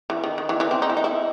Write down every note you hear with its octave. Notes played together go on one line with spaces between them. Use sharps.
E3
D#3
D#3
E3
E3
C4
D#4
E4
D#4
E4